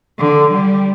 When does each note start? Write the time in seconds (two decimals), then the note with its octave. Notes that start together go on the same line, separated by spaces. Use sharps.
0.19 D3
0.51 G3